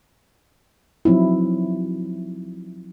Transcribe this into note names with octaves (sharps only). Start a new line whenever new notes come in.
F3 F#3 C4 D#4 E4